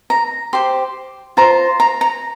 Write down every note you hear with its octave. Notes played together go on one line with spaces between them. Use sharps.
A#5
G4 C5 C6
F4 C5 A#5
A#5
A#5